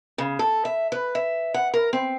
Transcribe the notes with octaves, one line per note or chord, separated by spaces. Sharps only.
C#3
A4
E5
B4
E5
F#5
A#4
C4